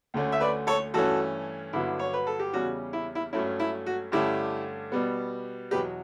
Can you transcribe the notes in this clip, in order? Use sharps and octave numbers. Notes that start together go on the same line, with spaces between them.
D2 D3 A3 C#4
E5
B4 D5
A4 C#5
G2 E3 A3 C#4 F#4 A4
G2 D3 F#3 B3 E4
C#5
B4
A4
G4
E2 C#3 G3 C#4 F#4
E4
E4
G2 F#3 A3 C#4 E4
E4
F#4
G2 D3 A3 C#4 E4 G4
B2 G3 B3
E2 B2 F#3 G4 B4